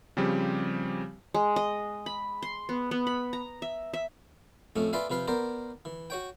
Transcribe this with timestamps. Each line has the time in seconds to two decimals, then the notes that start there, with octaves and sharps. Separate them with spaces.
0.17 C#3 F3 G3 C4 G4
1.34 G#3
1.56 D#5
2.06 B5
2.42 C6
2.69 B3
2.91 B3
3.07 B5
3.33 A#5
3.62 E5
3.94 E5
4.76 F2 A2 A3 C#4
4.93 F4 B4 D5 E5 F5 G#5
5.10 C3 F3 B4 F5
5.28 B3 A#4 C5 D5
5.85 E3
6.10 F#4 C#5 G5